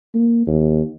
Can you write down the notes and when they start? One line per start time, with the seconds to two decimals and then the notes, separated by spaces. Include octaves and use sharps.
0.14 A#3
0.47 D#2